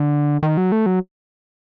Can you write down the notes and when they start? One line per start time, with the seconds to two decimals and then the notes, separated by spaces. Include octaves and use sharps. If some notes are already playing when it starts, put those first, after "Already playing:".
Already playing: D3
0.43 D#3
0.57 F#3
0.72 A3
0.86 F#3